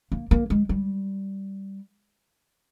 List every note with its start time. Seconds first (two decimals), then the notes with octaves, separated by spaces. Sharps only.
0.12 A#3
0.31 A#3
0.50 G#3
0.69 G3